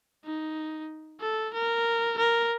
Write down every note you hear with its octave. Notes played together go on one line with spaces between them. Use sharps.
D#4
A4
A#4
A#4